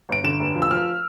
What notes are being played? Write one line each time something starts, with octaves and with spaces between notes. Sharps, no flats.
G1 D7
D3 E7
F1
F3
E6
F3 F6